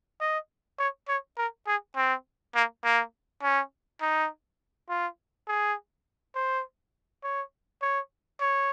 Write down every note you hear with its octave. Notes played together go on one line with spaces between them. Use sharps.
D#5
C#5
C#5
A#4
G#4
C4
A#3
A#3
C#4
D#4
F4
G#4
C5
C#5
C#5
C#5